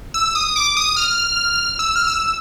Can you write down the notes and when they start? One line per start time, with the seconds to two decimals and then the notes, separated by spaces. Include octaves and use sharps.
0.14 E6
0.35 D#6
0.56 D6
0.77 D#6
0.97 F6
1.79 E6
1.96 F6
2.07 E6